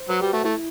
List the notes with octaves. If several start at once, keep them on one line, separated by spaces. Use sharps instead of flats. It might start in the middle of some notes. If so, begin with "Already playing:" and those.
Already playing: C5
F#3 B4
G3 F#4
A3 F#4
A3 E4